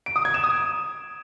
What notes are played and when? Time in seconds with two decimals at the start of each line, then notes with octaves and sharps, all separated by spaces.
0.06 D7
0.16 D#6
0.25 G#6
0.34 E7
0.44 D#6